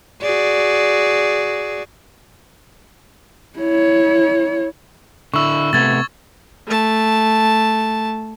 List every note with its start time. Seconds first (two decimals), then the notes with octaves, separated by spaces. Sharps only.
0.21 F#4 G#4 D5
3.59 E4 C#5
5.34 D3 E4 C#6 E6
5.73 C3 A3 B3 G#6 A6
6.67 A3 A5